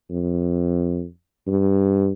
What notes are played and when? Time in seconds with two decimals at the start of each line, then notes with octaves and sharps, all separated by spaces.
0.10 F2
1.47 G2